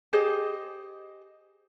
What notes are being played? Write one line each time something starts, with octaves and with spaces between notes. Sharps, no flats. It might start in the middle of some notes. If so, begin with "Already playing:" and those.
G4 G#4 C5 D#5